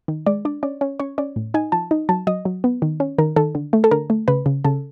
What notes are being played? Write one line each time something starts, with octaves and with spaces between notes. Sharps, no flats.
D#3
G#3 D5
D4 D5
C#4 D5
C#4
C#4 C#5
C#4 D5
A2
D#4 G#5
F3 A5
D#4
F#3 A5
F#3 D#5
F#3
B3
D#3
C#4
D#3 A#4
D#3 A4
D3
A3
A4
D3 A#4
A3
C#3 B4
C#3
C#3 A4